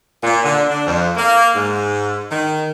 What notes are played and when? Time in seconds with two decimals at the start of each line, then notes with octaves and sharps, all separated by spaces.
0.23 A#2
0.44 D3
0.68 D4
0.86 F2
1.17 A#3
1.54 G#2
2.30 D#3